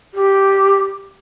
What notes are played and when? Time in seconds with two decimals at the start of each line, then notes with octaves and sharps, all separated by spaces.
0.14 G4